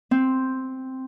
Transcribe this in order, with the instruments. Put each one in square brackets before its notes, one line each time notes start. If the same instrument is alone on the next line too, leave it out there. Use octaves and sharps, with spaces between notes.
[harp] C4